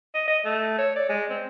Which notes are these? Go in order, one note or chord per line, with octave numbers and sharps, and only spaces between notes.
D#5
D#5
A3
C#5
D5
G#3
C4